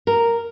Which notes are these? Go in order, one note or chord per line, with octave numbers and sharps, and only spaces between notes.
A#4